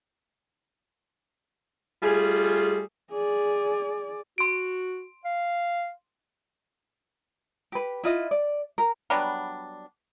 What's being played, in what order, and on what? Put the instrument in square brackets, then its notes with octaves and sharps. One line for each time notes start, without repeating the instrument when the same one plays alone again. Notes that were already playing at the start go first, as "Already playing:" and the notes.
[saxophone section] G3 A3 F4 G#4
[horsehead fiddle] G#4 D5
[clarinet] F#4 [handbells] C6 D7
[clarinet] F5
[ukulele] G4 B4
E4 F4 D#5
D5
A#4
[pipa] F#3 G3 B3 D4